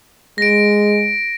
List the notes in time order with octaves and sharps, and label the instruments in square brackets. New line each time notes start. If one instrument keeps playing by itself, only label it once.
[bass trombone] G#3 [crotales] A#6 D7